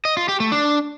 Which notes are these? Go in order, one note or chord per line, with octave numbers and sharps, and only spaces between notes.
D#5
F4
G4
A3
D4